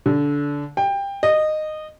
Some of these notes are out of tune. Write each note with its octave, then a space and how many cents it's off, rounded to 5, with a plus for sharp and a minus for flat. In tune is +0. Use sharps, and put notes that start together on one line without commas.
D3 -20
G5 +20
D#5 -15